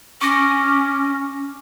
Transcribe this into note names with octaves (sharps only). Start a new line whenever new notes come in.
C#4 C#6 D6 A#6